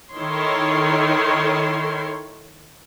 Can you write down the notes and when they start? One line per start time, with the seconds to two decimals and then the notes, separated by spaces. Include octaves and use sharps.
0.14 D#3 E4 A4 C#5 C6